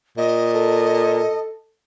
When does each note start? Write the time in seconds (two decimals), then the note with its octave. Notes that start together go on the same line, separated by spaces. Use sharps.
0.17 A#2 D#5
0.54 A4